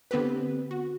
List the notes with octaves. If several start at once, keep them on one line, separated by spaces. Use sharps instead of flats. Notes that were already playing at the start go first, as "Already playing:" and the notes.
D3 B3 C4 G4 B4
F#4